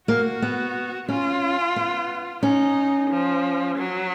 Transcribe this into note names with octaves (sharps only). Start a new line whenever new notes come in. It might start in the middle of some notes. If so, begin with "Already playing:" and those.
A#3 F#4
B3
C#4 F4
B3
C#4 D#4
F3
F#3